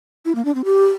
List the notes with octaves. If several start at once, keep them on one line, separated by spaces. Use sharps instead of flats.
E4
A#3
D4
C4
G4